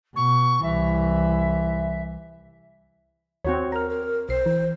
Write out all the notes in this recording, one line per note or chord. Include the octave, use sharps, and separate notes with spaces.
B2 C#6
C2 E3 E5
D#2 C4 F#4 C#5
A#4 A#5 F6
A#4
B1 C5 C7
E3